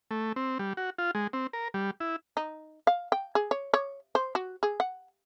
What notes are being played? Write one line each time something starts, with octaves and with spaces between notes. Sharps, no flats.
A3
C4
G3
F#4
F4
G#3
C4
A#4
G3
E4
D#4
F5
G5
G#4
C#5
C#5
C5
F#4
G#4
F#5